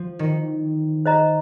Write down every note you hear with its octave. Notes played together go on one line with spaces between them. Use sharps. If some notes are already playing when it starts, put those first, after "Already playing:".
Already playing: F3
D#3
C5 D#5 A#5